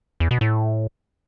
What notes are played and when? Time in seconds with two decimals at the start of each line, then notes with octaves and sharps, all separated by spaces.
0.20 E2
0.31 B2
0.41 A2